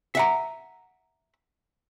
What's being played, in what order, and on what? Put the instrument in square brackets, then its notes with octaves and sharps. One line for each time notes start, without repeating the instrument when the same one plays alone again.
[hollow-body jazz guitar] E5 F#5 A#5